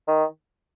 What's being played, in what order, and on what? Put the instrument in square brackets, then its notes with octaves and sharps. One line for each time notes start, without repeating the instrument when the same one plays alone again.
[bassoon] D#3